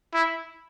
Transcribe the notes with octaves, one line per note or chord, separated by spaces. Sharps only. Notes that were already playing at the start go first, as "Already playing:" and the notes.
E4